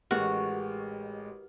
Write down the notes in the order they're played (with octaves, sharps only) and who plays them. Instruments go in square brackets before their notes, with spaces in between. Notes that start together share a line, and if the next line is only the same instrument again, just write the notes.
[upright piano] A1 G#3 F6 [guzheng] F#4 [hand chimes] G4 A#4 B4